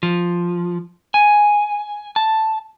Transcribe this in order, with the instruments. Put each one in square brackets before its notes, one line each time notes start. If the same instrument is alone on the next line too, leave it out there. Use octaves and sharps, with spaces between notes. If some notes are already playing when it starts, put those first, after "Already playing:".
[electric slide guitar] F3
G#5
A5